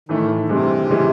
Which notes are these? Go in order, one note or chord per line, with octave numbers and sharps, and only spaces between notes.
A2 D#3 E3 A3
G2 C3 E3 G#3 C4
C#3 E3 G#3